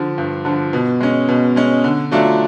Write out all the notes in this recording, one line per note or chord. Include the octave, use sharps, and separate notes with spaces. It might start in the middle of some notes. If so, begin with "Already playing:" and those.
Already playing: D3 F3
G2
D3 F3
B2
G#3 C#4
B2
G#3 C#4
D3
F#3 A3 D4 F4